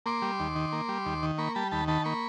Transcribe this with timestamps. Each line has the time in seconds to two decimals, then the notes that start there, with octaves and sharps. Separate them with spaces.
0.06 A#3 C6 D6
0.22 G3
0.40 D#2
0.55 D#3
0.72 A#3
0.88 G3
1.06 D#2
1.23 D#3
1.38 A#3 B5 C#6
1.55 G3 A5 B5
1.71 D#2 A5 B5
1.88 D#3 A5 B5
2.04 A#3 B5 C#6